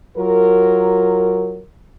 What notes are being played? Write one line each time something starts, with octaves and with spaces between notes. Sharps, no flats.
F#3 F4 A#4